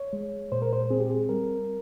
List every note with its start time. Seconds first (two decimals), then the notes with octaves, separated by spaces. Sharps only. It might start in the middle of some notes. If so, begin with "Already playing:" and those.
Already playing: C#5
0.13 G#3
0.52 A#2 C5
0.62 A#4
0.73 C5
0.90 C4 G#4
1.00 G4
1.10 G#4
1.29 G3 A#4